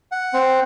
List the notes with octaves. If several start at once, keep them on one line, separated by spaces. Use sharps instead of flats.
F#5
C4